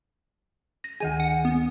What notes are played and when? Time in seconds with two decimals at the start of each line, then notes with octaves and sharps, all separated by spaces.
0.84 A#6
1.00 D2 D#3 G#4 G#5
1.20 F#5
1.45 B3